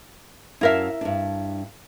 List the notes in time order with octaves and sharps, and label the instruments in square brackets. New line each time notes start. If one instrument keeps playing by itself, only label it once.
[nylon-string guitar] F#2 F5 A5 [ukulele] E4 A#4 E5
[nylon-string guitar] G2 D4